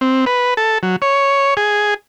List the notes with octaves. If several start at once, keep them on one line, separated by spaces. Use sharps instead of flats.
C4
B4
A4
F#3
C#5
G#4